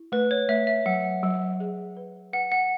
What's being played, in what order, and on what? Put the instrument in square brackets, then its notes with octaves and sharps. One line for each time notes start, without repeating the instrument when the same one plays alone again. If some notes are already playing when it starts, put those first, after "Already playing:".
Already playing: [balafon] E4
[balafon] A3 [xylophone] B4
[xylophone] C#5
[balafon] A3 [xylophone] E5
[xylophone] E5
[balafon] F#3 [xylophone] F#5
[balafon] F#3
G#4
B4
[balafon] B4 [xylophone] F#5
[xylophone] F#5